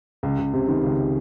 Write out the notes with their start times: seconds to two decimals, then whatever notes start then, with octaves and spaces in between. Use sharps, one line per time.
0.23 C#2
0.38 C#2
0.53 C3
0.68 D#3
0.83 C#2